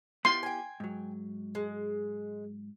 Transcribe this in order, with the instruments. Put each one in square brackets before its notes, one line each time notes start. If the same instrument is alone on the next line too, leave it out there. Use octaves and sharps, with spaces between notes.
[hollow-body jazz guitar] B3 E4 G4 [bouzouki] F4 [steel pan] C6
[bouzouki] G5 G#5
[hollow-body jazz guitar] G#2 F#3
[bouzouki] G#3